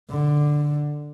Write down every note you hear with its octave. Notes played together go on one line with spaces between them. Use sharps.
D3